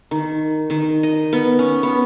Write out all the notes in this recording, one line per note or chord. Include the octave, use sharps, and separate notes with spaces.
D#3
D#3
D#5
B3
C#4
B3